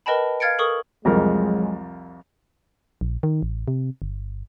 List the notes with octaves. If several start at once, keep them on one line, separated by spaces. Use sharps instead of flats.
A#4 B4 D#5 G5 A5 B5
F5 F6 G#6 A6 C#7 D7
A4 A#4 C#6 D#6
C2 F2 F#3 G#3 A#4
A#1
D#3
A1
C3
G1